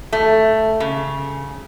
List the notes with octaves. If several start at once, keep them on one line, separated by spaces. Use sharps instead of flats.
A3
C#3